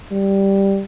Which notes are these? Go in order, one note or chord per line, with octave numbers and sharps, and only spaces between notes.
G3